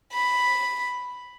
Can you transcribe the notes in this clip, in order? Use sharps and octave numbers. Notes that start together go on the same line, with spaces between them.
B5